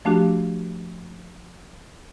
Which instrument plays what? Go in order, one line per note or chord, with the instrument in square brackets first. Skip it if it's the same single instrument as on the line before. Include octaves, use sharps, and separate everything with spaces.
[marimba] F3 A3 D4 F#4 G4